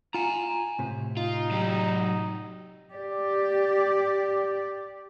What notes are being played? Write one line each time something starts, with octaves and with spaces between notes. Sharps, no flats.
F4 G#5 A#5
A2 C3
D#4 F4
F#3 G4
G4 D5